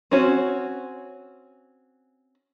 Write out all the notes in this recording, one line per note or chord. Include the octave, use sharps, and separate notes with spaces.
C4 C#4 F#4